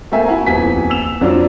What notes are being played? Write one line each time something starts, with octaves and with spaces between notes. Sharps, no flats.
A3 A#3 C4 E5 G#5
E4 F#4 G#5 A#5
D#1 F2 B3 G#5 B6
E6 E7 F7
F2 F#3 D4 F4